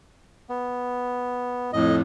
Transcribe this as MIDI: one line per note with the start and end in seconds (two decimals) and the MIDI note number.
0.49 1.71 59
1.73 2.01 41
1.73 2.01 45
1.73 1.96 75